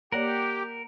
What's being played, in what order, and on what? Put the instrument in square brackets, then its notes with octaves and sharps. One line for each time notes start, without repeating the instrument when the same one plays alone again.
[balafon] A#3 C#5 D5 [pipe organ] G4 [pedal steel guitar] A#4 F#5